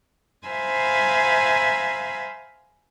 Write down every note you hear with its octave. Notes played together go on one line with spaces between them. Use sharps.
C5 E5 F5 G#5 A#5 B5